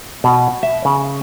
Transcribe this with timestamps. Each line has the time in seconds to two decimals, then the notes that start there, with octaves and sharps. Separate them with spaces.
0.24 B2
0.63 E5
0.85 C#3